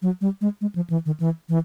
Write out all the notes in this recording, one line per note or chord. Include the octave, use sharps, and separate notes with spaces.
F#3
G3
G#3
G#3
F3
E3
D#3
E3
E3